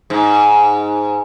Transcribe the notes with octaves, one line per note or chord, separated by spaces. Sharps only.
G#2